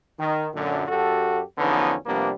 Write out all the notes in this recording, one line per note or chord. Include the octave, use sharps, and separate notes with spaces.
D#3
F#2 A#2 D3
F#2 F#4 G4 A4
E2 D3 F3 B3 C#4 D#4
C3 F3 G3 A#3 B3 D4